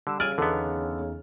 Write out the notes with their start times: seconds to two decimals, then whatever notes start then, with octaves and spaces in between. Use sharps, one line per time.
0.07 D3 G3 E6
0.20 C#3 D5 G#5 F6
0.38 E2 D3 B3 D#4 A4